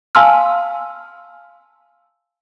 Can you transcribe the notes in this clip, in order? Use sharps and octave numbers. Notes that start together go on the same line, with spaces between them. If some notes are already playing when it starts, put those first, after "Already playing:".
F5 G#5 A5 C6 E6 F6